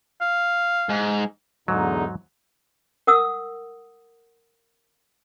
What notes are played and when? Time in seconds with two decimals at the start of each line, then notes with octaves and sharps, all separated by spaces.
0.21 F5
0.90 G#2
1.68 E2 G#2 D3 F#3 D#4
3.07 A#4 F#5 D#6 E6